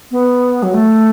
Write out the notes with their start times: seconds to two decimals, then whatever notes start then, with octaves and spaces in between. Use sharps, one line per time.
0.12 B3
0.63 F#3
0.74 A3